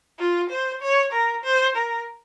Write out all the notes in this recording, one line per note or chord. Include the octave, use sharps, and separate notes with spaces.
F4
C5
C#5
A#4
C5
A#4